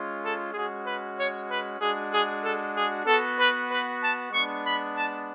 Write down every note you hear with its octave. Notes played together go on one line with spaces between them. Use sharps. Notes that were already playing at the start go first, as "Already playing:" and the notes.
Already playing: G#3 C#4 F4
A4
G#3 C#4 F#4 G#4
B4
C#5
B4
G#3 D4 F#4 G#4
G#4
A4
G#4
B3 F#4 A4
B4
B4
A5
G#3 B3 D4 C#6
B5
A5